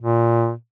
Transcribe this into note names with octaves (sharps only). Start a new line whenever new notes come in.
A#2